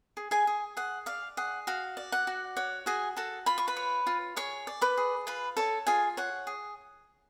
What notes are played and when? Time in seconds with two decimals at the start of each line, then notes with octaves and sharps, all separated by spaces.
0.17 G#4
0.31 G#4 G#5
0.47 G#4
0.77 G#4 F#5
1.06 D5 F5
1.37 G#4 F#5
1.67 F#4 F5
1.97 D5
2.12 F#5
2.27 F#4
2.57 C#5 F#5
2.86 F#4 G#4 G#5
3.17 F#4 A4 A5
3.46 F4 B5
3.58 C#6
3.67 B4 B5
3.77 C#5
4.07 F4
4.36 G#4 C#5 C#6
4.67 D5
4.81 B4 B5
4.97 G#4
5.27 F4 B4 B5
5.57 A4 C#5 A5
5.87 F4 G#4 G#5
6.17 C#5 F#5
6.47 G#4